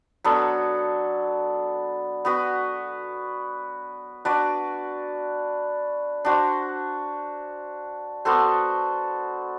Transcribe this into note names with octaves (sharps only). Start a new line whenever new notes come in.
F#3 B3 D4 A4
B3 F#4 B4
D4 F#4 B4 D5
D4 F#4 C5
B3 F#4 A4 C5